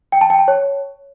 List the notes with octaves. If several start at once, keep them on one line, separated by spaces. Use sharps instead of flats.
G5
A5
G5
A5
C#5